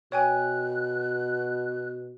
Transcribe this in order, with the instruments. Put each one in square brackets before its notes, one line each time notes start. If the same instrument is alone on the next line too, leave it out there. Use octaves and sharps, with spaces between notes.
[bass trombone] B2 [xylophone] C#5 G5 G#5 [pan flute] F#6